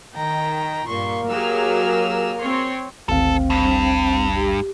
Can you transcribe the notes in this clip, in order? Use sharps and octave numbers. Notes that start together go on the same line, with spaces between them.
D#3 G5 A#5
G2 A#2 A#3 C6 C#6
F#3 G4 G#4 A#4 G#5 E6 F6
C4 C#5 C6
G#1 D2 C4 A4 F5
G2
G4